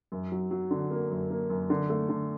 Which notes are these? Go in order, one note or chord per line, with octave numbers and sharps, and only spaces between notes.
F#2
F#3
F#3
D3
A#3
F#2
A#3
F#2
D3
A3
D3